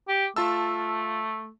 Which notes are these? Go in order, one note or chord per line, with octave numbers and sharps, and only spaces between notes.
G4
A3 F4 A5 E6